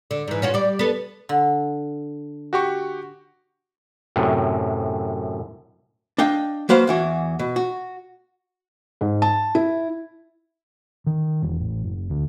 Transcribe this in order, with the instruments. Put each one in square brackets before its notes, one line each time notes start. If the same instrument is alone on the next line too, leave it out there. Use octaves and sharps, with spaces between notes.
[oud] D3
G#2 E3
C#4 F4 F#4
G3 D5
B3 A4
[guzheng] D3
[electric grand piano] F#4 G4 C#6
[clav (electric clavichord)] F#2 A2 C3
[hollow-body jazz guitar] D4 D#5 F5 G5
F#3 A#3 B4 C5 F5
E2 E3 F#4
B2
F#4
[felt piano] G#2
A5
E4
[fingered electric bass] D#3
E1
A1
F#1
D2